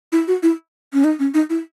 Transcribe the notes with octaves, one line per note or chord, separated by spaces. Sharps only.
E4
F#4
E4
C#4
D#4
C#4
D#4
E4